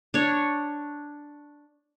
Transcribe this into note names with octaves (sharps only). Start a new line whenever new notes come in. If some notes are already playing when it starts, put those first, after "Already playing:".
D4 C#5